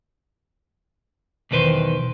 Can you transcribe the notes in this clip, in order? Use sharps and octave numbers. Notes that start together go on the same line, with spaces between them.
B1 E2 D#3 B4 C5